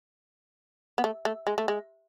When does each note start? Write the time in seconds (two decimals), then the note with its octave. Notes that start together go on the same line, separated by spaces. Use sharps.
0.98 B3
1.04 A3
1.25 A3
1.47 G#3
1.58 A3
1.68 G#3